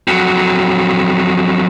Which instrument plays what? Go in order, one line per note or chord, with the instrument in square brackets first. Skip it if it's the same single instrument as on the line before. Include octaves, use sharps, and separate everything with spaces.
[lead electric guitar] F2 F#3